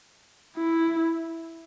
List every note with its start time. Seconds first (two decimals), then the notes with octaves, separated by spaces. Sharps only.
0.58 E4